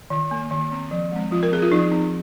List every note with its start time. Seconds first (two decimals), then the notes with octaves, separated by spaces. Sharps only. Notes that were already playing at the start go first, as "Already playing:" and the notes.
0.10 D#3
0.31 A#3
0.51 D#3
0.72 C4
0.91 F3
1.12 G#3 C4
1.31 F3 F4
1.43 A#4
1.52 C4 G#4
1.62 F4
1.72 F3 D#4
1.91 C4